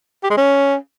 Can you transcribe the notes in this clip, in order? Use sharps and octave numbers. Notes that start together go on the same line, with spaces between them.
G4
G#3
C#4